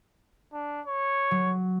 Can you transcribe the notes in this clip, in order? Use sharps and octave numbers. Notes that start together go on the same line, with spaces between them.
D4
C#5
F#3